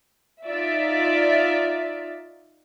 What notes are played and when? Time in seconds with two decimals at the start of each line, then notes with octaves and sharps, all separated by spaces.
0.44 D#4 F4 D5 E5